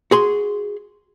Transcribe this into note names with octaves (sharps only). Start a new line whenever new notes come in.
F#4 G#4 C6